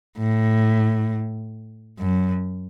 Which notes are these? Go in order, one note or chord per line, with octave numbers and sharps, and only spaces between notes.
A2
F#2